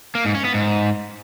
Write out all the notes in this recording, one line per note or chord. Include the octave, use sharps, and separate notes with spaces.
A#3
G#2
C#4
B3
G#2